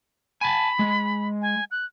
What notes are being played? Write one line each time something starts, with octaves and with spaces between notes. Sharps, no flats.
G#5 A5 B5
G#3
G#5
F#6